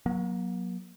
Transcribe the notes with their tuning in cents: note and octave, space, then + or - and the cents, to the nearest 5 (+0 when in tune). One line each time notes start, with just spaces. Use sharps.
F#3 -10 A#3 +40